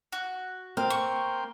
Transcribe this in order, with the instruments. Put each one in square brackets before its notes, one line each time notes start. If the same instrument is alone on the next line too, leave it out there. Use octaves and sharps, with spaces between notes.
[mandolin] F#4
[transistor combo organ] A#3 G5 C6 [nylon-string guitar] C4 [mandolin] F5
[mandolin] C#6